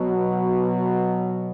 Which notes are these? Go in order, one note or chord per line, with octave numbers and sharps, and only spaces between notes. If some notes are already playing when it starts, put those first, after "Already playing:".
Already playing: B2 F#3